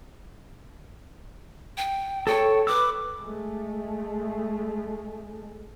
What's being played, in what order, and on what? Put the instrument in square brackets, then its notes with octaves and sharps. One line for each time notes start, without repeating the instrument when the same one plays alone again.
[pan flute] G5
[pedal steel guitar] A4 C#5 [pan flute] G5
[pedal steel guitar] B4 E6 [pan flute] D6
[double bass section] G#3 A3